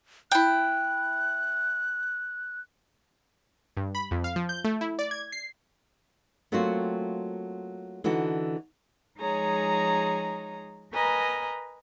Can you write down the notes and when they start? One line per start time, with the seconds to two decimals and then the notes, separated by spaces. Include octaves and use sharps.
0.32 E4 G5 F#6
3.77 G2
3.95 B5
4.11 F2
4.24 F5
4.36 F3
4.49 G6
4.64 A3
4.81 E4
4.99 D5
5.11 G#6
5.32 C7
6.52 F#3 A3 A#3 C4 F4 F#4
8.04 D3 E3 D#4 F#4 A4
9.20 F3 G#3 D#4 G#4 C#5 A#5
10.92 A#4 B4 D#5 G#5 A#5